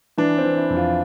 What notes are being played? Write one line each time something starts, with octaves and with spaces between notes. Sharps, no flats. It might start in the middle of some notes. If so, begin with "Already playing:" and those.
E3 D4
C4
E3
E4
F2
F4